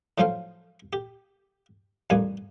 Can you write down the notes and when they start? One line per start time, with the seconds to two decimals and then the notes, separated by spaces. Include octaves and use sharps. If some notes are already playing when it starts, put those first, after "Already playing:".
0.18 A2 F3 F#3 C#4 C5 F5
0.93 G4
2.10 A1 F2 G3 A#3 G#5